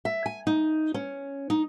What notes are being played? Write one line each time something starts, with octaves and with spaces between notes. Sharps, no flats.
E5
G#5
D#4
C#4
D#4